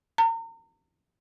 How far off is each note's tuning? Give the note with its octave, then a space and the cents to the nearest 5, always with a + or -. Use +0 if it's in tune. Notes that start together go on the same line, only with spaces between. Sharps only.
A#5 -40